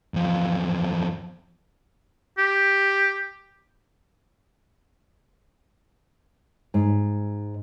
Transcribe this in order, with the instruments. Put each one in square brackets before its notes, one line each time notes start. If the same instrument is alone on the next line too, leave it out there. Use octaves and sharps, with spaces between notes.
[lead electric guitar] E2 F3
[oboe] G4
[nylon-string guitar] G#2